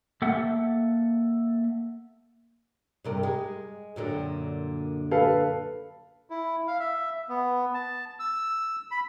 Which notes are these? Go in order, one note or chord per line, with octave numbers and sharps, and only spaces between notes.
A#3 A4 E5 F#5
G2 C3 A#4
G#3
F#2 A#2 D3
A4 B4 F5
E4
F5
E5
B3
A5
E6
B5